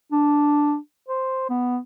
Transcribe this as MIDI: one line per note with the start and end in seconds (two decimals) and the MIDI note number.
0.12 0.76 62
1.09 1.46 72
1.49 1.78 59